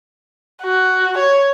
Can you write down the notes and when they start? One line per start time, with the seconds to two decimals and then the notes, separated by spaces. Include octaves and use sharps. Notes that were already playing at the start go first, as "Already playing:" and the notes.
0.63 F#4
1.18 C#5